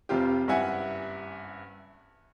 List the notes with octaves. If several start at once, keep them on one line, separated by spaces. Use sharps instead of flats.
F1 F2 C3 F4 G4
F#1 G2 E4 E5 F#5 G#5